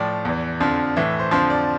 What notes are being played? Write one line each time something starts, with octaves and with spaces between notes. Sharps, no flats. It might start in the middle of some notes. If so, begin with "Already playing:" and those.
Already playing: A2 F3 D5
E2 E3
F2 D3 F3
A2 E3 E5
C5
F2 D3 F3 C5
D5